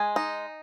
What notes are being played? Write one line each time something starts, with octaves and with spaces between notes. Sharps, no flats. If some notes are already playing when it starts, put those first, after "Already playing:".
Already playing: G#3 G#5
D#4